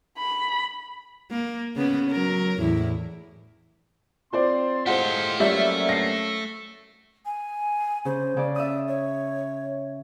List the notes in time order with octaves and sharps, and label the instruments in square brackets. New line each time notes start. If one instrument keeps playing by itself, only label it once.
[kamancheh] B5
[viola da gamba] A#3
C#3 B3 C#4
F#3 A#4
E2 A2 E4
[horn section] C4 C6 [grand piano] F4 C5 D5
[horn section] A2 G#3 F4 [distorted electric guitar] G4 A4 [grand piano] C5 F#5
[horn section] F#3 A#3 C#4 [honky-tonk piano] G3 E5 [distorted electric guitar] A3
[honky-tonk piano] A#6 C7
[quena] G#5
[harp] C#3 [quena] C5
[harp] C#3 D5
[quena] D5 [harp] E5 D#6
[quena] C#5